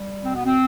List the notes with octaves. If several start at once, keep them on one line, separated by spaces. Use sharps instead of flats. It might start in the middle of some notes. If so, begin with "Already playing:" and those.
Already playing: G3
B2 C4
B3
C4